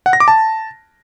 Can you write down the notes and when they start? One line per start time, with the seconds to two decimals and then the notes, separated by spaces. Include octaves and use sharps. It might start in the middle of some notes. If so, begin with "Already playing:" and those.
0.06 F#5
0.13 A#6
0.20 D6
0.28 A5